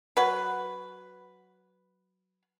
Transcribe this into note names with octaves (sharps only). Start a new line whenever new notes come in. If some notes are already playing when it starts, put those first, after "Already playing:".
F#3 B4